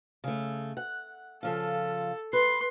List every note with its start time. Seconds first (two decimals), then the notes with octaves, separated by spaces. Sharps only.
0.24 C#3 A3
0.77 F#5
1.43 C#3 F3 F4 A4
2.33 B4 C6